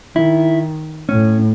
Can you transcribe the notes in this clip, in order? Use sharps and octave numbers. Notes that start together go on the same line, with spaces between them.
D#3 E4
A2 C#4